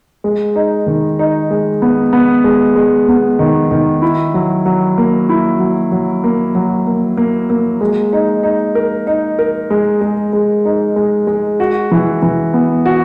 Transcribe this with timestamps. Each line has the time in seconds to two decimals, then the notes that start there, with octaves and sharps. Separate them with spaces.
0.24 G#3
0.56 D#4
0.87 D#3
1.19 D#4
1.50 G#3
1.82 B3
2.13 B3
2.44 G#3
2.76 G#3
3.09 B3
3.39 D#3
3.71 D#3
4.02 E4
4.34 F#3
4.65 F#3
4.98 A#3
5.29 E4
5.60 F#3
5.92 F#3
6.24 A#3
6.55 F#3
6.87 A#3
7.17 A#3
7.50 A#3
7.81 G#3
8.13 D#4
8.43 D#4
8.75 A#4
9.07 D#4
9.39 A#4
9.70 G#3
10.01 G#3
10.33 G#3
10.65 D#4
10.96 G#3
11.27 G#3
11.60 F#4
11.91 E3
12.22 E3
12.54 B3
12.86 F#4